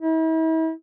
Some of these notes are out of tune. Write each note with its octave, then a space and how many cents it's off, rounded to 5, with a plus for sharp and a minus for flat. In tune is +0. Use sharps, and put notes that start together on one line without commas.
E4 -40